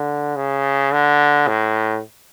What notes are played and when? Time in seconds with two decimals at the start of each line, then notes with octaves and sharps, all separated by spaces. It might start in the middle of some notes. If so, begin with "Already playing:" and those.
Already playing: D3
0.36 C#3
0.93 D3
1.47 A2